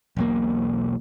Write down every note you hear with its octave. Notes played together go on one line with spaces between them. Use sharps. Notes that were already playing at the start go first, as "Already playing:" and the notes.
E1 B1 A#3